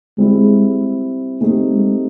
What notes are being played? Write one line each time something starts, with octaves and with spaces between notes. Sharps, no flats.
G3 G#3 C4 E4
A3 A#3 C4 D#4 G4
G#3